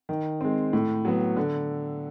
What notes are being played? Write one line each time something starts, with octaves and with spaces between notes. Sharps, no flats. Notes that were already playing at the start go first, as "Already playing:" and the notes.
D#3
G#3 C4
A2
F#3 B3
D3